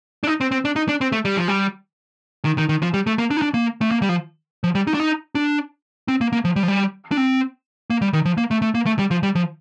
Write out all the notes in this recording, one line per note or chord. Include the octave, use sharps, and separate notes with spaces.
D4
D#4
C4
C4
D4
D#4
D4
C4
A3
G3
F3
G3
D#3
D#3
D#3
F3
G3
A3
A#3
D4
D#4
D4
A#3
A3
A#3
G3
F3
F3
G3
D#4
D4
D#4
D4
C4
A#3
A#3
F3
G3
F3
G3
D4
C4
A#3
G3
D#3
F3
A#3
A3
A3
A#3
A3
G3
F3
G3
F3